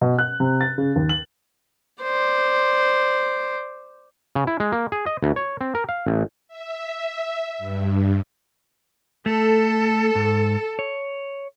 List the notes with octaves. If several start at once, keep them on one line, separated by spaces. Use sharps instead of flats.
B2
F#6
C3
A6
C#3
D#2
F#7
C5 D5
C#3
E4
G#3
A#3
G#4
D#5
D2
C#5
C4
A#4
F5
A1
E5
E5
G2
A3 A4
G#2
C#5